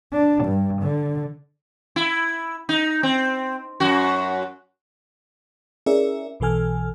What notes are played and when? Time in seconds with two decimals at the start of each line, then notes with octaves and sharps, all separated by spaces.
0.12 D4
0.44 G2
0.82 D3
1.96 E4
2.69 D#4
3.03 C4
3.80 F#2 F#4
5.86 C#4 E4 G#4 A#4 D5 E5
6.40 B1 B2 E3 A4 G#5 F6